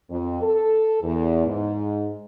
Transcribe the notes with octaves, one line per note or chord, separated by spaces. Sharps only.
F2
A4
E2
G#2